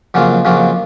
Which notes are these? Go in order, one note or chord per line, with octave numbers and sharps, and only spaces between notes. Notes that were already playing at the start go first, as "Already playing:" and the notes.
F2 C#3 F#3 A#3 F4
F2 C#3 F#3 A#3 F4